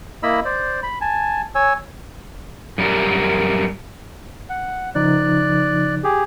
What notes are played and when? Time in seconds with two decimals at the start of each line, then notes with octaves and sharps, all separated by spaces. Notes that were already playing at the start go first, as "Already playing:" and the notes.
0.23 A#3 E4 D#5 B5 E6
0.45 C5 D5
0.83 B5
1.01 G#5 A5
1.55 C#5 G#5 E6
2.78 F#2 G3 A#4
4.50 F#5
4.95 C#3 F3 D#4 D5 F#6
6.04 G4 G#4